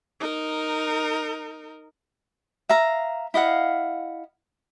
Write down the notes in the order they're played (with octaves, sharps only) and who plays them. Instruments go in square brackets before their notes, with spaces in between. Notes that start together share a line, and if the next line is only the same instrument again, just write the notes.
[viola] D#4 A#4
[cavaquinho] E5 F5 A#5
E4 D#5 F5 F#5